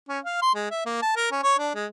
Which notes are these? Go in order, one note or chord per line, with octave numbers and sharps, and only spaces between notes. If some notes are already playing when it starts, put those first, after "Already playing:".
C#4
F5
C6
G#3
E5
A#3
A5
A#4
C#4
C#5
D4
G#3